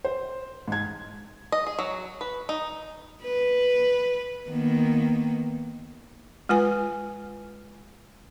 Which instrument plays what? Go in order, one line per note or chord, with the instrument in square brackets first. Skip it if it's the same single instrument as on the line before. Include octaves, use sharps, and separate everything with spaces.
[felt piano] C5
G#2 G#6
[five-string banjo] D#5
G#4
F#3
B4
D#4
[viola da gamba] B4
D#3 A#3 B3
[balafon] G#3 F4 B4 G#5